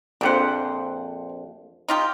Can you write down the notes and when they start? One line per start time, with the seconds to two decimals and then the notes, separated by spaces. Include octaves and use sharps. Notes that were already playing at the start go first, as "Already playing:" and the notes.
0.21 A#1 F2 D4 G4 C5 F#5
1.88 D#4 F4 G4